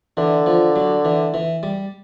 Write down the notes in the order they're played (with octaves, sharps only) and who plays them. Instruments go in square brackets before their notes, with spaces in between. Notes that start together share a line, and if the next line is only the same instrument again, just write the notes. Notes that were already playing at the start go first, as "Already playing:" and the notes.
[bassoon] D3 [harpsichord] E3
[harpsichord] F3
F#3
E3
E3
G3